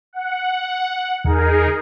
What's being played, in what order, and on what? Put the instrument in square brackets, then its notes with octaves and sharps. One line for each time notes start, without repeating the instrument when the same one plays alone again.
[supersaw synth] F#5
[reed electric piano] E2 [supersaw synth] D#4 G#4 A#4